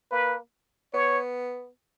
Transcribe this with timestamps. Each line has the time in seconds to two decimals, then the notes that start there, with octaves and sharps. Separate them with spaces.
0.11 A#3 B4
0.94 B3 C#5